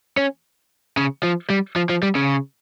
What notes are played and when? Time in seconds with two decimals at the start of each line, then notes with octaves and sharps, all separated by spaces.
0.17 C#4
0.97 C#3
1.23 F3
1.50 G3
1.76 F3
1.89 F3
2.03 G3
2.15 C#3